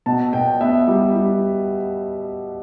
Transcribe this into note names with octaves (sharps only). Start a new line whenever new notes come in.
B2 A5
B2 G5
B3 E5
G3
G3